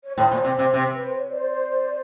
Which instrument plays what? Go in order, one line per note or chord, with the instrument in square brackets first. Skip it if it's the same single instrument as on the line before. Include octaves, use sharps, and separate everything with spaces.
[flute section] C#5
[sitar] A2 [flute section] C5
[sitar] A#2
C3
C3
C3
[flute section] B4
C5
C#5
C5 D5